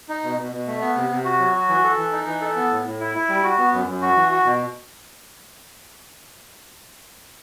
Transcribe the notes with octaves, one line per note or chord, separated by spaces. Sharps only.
D#4
B2
B2
B2
A3
B3
C3
C3
F#4
F#3
F#4
E3
A4
E3
D#4
E3
A4
B3
A2
A2
E4
E4
G3
F#4
B3
F#2
F#2
F#4
E3
F#4
B2